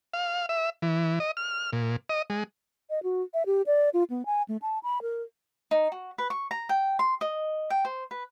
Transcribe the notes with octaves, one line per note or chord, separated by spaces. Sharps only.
F5
E5
E3
D#5
F6
A#2
D#5
G#3
D#5
F#4
E5
G4
D5
F4
B3
G#5
A3
A5
B5
A#4
D#4
F#4
B4
C#6
A#5
G5
C6
D#5
G5
C5
B4